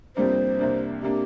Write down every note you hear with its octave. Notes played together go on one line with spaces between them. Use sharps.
F2 C3 G3 A#3 D4 C5
C2 C3 A#3 D4
C3 A#3 D4 G4